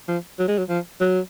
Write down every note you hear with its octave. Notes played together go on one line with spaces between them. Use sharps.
F3
F#3
G#3
F#3
F3
F#3